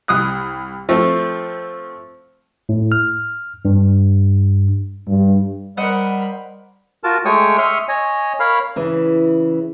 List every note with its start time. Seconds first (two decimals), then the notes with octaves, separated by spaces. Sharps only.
0.08 C2 D#6 F#6
0.89 F3 A3 C4
2.69 A2
2.92 F6
3.65 G2
5.07 G2
5.77 G3 A#4 C5 D#5 F#5 B5
7.04 F4 F#4 A#4 A5
7.25 G#3 A3 C#5 G5 C#6 D#6
7.58 E5 C6 C#6 D#6 F6
7.89 C#5 D#5 G#5
8.40 A#4 C#5 F5 B5
8.76 C#3 E3